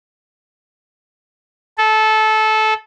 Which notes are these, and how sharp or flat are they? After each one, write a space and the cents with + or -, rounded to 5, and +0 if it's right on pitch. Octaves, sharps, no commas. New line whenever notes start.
A4 -20